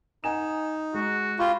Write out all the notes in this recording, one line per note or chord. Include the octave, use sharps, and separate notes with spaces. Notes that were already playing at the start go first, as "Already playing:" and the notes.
D#4 F#5 G#5 E7
G#3 F#4
F4 G4 B5 C#6